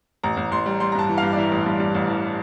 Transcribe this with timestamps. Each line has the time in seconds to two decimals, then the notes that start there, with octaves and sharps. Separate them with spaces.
0.23 A1 A#5
0.37 A1
0.51 A1 C6
0.66 G3
0.80 G3 C6
0.92 A#5
0.95 G2 A5
1.09 E3
1.18 G2 F5
1.33 D5
1.37 E3 E5
1.51 A1
1.66 G2
1.80 G2
1.95 A1
2.08 E3